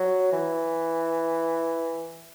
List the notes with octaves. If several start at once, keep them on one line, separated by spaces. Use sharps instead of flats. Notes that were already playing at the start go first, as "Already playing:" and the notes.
Already playing: F#3
E3